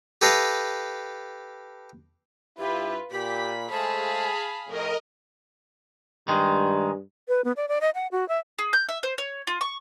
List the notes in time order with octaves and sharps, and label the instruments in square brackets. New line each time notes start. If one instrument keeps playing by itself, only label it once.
[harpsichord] G4 A4 B4 D#5 F5
[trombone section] G2 E4 [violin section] F4 B4 [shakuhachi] G4
[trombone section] A#2 [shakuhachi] G4 [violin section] B5 B6
[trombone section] G#3 A3 C5 [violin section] G#4 F5 B5 [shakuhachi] A5
[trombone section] F2 A2 [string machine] A#4 D#5
[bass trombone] G2 [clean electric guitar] D#3 G#3
[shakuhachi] B4
B3
D5
D5
D#5
F#5
F#4
E5
[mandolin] G#4
G6
E5
C5
C#5
F4
C#6